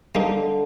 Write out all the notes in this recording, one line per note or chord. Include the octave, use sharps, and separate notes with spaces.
D3 G3 A#3 D#4